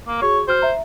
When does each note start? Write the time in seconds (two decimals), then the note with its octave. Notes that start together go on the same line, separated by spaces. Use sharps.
0.07 A#3
0.22 F#4 G#4 C#5
0.48 F#4 C5 F6
0.62 E5 A#5